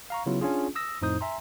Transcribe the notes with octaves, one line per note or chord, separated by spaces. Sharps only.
F5 A#5 C#6
C#3 F#3 B3 E4 F4
C#4 D4 F4 G#4
D#6 E6 A#6
F2 A2 D#4 C5 D#6 G6
E5 G#5 A#5 C6